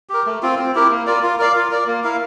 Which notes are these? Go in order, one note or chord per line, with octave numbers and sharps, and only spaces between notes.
G4 A#4
A3
C4 F4
C4
E4 G4 A#4
A#3
F4 A#4 D5
F4
A#4 D5 F5
F4
A#4 D5
A#3
E4 A#4 F5